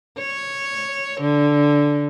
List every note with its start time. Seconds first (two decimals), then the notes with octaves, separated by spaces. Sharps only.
0.19 C#5
1.20 D3